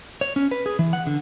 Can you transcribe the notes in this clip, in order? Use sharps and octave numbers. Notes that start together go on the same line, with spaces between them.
C#5
C#4
B4
G#4
E3
F#5
D3